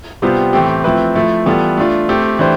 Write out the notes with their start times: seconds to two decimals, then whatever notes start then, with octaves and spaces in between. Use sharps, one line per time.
0.22 C3 G3 B3 F4 C5
0.53 A2 E3 A3 C4 G4
0.84 F3 A3 C4 E4 B4
1.15 F3 A3 E4
1.46 E3 G3 B3 F4 A4
1.77 A3 D4 F4
2.09 A3 C4 G4
2.39 E3 A3 D4 G4 C5